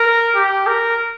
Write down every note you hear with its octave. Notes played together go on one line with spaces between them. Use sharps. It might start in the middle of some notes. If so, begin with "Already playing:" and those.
Already playing: A#4
G4
A#4